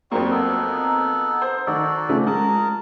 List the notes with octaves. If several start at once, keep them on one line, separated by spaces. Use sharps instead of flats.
F2 F#3 G3 A#3 C4 C#6
B3 D#4 A4
C5
D#3 F#4 A4 D5
C#3 F3 A3
G#3 A#4 A5